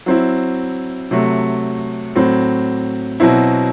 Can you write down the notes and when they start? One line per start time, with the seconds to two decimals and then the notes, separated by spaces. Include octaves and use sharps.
0.06 F#3 C4 E4
1.11 C3 F#3 A3
2.16 A2 F#3 C4
3.20 B2 F#3 C4 E4